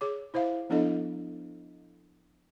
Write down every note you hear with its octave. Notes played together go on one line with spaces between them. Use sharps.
G#4 C#5 D6
E4 C5 E5 F5
F3 B3 D4 E4 A4 D#5